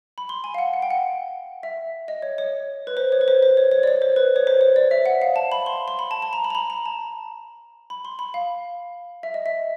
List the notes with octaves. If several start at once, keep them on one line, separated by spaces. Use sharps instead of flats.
B5
C6
G#5
F5
F#5
F#5
G5
F#5
E5
D#5
C#5
C#5
B4
C5
C#5
B4
C5
C5
C#5
C#5
D5
C#5
C5
B4
C#5
C5
C#5
D5
E5
F#5
F5
A5
B5
C6
C6
B5
A5
A5
A#5
B5
A#5
B5
A#5
A5
B5
C6
B5
F5
E5
D#5
E5